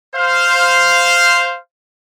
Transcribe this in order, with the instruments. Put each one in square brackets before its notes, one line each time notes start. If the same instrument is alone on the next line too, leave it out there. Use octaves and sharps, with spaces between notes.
[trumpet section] C5 F5